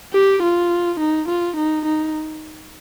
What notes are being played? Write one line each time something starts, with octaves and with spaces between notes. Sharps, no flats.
G4
F4
D#4
F4
D#4
D#4